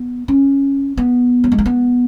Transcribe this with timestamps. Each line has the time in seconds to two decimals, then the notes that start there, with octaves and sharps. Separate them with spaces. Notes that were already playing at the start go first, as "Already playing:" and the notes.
Already playing: B3
0.28 C#4
0.98 B3
1.44 F#3
1.52 G#3
1.58 A#3
1.66 B3